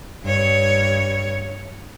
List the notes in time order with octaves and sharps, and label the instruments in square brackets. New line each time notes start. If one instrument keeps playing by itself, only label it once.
[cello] G2 C#5